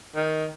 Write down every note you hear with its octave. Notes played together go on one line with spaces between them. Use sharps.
D#3